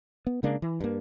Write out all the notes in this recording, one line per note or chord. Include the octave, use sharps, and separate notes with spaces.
B3
C#3 G#3 A#3 D4
E3
G2 A#3